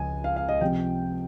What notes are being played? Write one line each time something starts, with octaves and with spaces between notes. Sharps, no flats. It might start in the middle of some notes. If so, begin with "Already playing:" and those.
Already playing: C#2 C#3 F3 G#5
F5
F5
D#5
C3 F3 G5